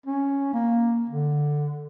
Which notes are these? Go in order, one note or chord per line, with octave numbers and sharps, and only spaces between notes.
C#4
A#3
D3